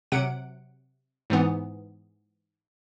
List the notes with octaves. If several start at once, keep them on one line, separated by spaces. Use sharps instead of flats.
C3 F#3 F#5 D7
G#2 E3 B3